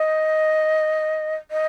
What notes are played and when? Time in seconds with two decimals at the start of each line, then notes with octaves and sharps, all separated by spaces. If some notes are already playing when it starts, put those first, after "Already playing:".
Already playing: D#5
1.51 D#5